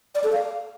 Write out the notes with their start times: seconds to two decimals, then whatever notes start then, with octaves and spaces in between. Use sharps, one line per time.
0.15 D5
0.24 A4
0.32 F5